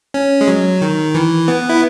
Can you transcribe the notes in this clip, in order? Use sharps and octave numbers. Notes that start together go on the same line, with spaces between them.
C#4
G#3
F#3
D#3
E3
B3
E4